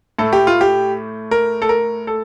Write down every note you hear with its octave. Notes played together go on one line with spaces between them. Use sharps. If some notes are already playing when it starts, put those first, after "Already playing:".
A2 A3 A4
G4
F4
G4
A#4
A4
A#4
A4